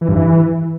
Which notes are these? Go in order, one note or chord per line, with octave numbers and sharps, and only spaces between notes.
E3
G2
E3